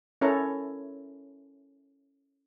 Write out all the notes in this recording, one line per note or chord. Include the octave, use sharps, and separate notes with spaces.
C#4 E4 A4 A#4 C#5 A#5